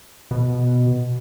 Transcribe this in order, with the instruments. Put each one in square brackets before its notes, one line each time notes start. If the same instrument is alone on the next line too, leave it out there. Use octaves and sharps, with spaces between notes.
[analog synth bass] B2